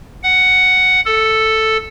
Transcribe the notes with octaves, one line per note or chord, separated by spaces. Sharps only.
F#5
A4